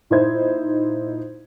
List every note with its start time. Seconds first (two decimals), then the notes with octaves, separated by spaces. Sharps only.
0.10 A#2 D#4 E4 C5 G#6